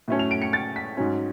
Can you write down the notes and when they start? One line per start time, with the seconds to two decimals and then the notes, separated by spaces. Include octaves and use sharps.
0.08 A2 F#3 A3 C#4
0.19 F7
0.31 D7
0.42 C#7
0.53 A6
0.76 B6
0.97 G#2 F#3 C#4